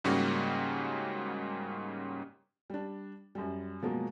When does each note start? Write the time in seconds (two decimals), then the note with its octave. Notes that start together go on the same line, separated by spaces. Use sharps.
0.04 G#2 C#3 G3 A#3 C#4 F#4
2.70 G3 D4
3.35 F#2 G3
3.82 B2 F3 F#3 G#3 A#3